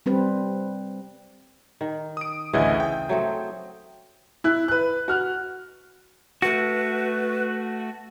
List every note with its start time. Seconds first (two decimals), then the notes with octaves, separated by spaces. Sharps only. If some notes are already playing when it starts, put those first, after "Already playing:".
0.06 G3 C4 B4
1.81 D#3
2.17 D#6 D7
2.53 A1 D2 C#3 E3 G#4 D#5
2.80 G5
3.09 F#3 A3 C4
4.44 E4 F#6
4.68 B4 F#6
5.08 F#4 F6 F#6
6.42 A3 F#4 B4